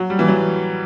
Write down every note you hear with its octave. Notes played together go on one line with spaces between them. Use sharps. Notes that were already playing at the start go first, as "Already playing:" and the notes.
Already playing: F#3
G3
E3
F#3